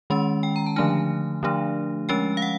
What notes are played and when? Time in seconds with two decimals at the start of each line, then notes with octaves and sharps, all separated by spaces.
0.10 D#3 G#3 C#4 C6
0.43 G5
0.56 A#5
0.66 A5
0.76 D3 F3 A3 D4 G#5
1.43 D3 F3 A3 D4
2.09 F3 G#3 C#4 G5
2.37 F5
2.42 F#5